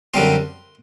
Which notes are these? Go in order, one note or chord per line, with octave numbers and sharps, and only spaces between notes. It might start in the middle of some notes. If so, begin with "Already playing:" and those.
F#2 D3 G3 C4 F4 C6